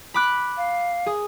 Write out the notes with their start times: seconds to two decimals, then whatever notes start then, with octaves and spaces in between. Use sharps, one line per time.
0.14 B5 D6 F#6
0.57 F5
1.06 G#4